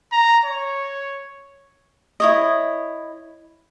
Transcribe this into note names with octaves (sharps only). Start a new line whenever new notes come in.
A#5
C#5
E4 C#5 D#5